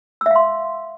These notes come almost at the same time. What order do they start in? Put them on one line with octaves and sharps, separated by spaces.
E6 E5 F5 C6